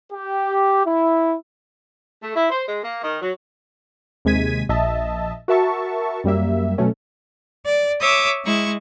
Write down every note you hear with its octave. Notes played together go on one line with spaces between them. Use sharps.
G4
E4
A3
E4
C5
G#3
A#3
D#3
F#3
D#2 C3 G#3 G#6 B6 D#7
A#1 D#5 E5 A5
F#4 A#4 E5 A5 C#6
F#2 G3 A#3 E5
B2 F#3 A3 C#4
D5
C#5 E5 D6 D#6
G#3 E4 C#6